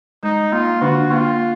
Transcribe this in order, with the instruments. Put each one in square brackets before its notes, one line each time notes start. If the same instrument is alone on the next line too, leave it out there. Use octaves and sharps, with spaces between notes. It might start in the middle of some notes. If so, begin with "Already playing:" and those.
[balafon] G#3 [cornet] D#4
[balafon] A#3 [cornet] F4
[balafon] D3 D4 [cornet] F#4
[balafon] A#3 [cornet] F4